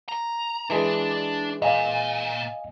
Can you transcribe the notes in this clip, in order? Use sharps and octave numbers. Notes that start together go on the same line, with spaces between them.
A#5
E3 G#3 D4 D5
A#2 D#5 F5 G#5